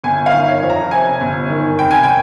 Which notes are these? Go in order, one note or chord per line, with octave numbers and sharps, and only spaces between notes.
G1 G#5
F5
D#3
C#5
F2
A#5
C3 G#5
G1
D#3
F1 G5
G#5
G5